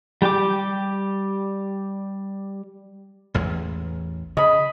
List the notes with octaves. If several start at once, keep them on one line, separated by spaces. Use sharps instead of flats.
G3 G4 G5 D6
A1 E2 G#3
C#3 D#5 B5